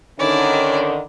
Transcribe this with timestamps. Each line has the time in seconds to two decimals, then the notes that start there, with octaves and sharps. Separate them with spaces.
0.19 D3 D#3 C#4 E4 D5